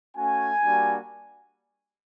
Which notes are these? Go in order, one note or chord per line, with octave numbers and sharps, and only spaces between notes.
A3 C#4 F#4 G#5
G3 A#3 D4 F#4